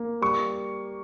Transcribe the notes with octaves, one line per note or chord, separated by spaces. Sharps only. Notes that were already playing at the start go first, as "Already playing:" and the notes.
Already playing: A#3
G3 C#6